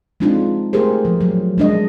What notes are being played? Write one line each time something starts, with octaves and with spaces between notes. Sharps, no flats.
G#3 C4 D4 D#4 F4
A3 G4 G#4 A#4 C5
F3
F#3
G#3 D4 D#5